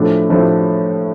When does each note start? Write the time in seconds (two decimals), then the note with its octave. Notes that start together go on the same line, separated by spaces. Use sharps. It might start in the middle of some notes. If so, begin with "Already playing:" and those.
Already playing: A2 F3 A3 D4
0.30 A2 F3 A3 D4